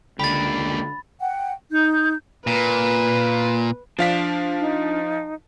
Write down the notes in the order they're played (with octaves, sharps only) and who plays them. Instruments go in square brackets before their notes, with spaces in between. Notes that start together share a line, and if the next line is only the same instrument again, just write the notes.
[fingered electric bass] C#2 D3 [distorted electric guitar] A#3 G4 [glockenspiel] B5 A6
[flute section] F#5 G5
D#4 G6
[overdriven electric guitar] A#2 [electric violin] B4
[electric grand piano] F3 F5 B6 [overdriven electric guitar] D4 D5
[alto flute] D#4